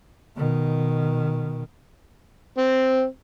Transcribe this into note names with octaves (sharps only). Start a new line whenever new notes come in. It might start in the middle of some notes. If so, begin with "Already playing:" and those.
B2 D#3
C4